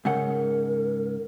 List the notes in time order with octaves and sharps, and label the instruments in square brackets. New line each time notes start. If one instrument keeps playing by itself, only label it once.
[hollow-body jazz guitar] G#2 C#3 F#5 [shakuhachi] A#4